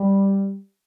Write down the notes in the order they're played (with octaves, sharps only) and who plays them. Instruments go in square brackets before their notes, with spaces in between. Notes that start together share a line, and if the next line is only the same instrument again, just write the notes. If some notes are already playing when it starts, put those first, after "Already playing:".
Already playing: [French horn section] G3